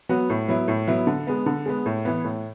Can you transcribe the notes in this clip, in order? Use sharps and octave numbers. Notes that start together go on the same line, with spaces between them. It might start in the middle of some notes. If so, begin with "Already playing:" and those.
F#3 B3 F#4
A2
F#3 B3 E4
A2
F#3 B3 E4
D3
G#3 B3
D3
G#3 B3
A2
E3 B3
A2